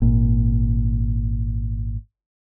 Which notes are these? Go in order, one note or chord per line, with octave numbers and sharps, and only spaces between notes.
G#1 A#2